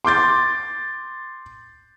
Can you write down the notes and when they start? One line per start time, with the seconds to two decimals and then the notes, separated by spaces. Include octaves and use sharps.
0.05 C6 D6 G6 A6